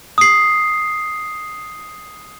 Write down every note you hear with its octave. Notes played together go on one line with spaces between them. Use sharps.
D#6 C7